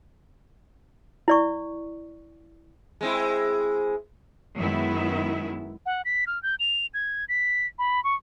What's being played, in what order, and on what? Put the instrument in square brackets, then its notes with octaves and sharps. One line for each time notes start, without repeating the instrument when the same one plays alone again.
[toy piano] E4 D5 C#6
[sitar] G#3 C4 E4
[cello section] F#2 D#3 G#3 B3 E4 E5
[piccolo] F#5
B6
F6
G6
F7
G#6
B6
B5
C#6